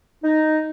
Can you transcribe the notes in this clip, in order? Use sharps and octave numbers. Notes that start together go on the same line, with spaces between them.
D#4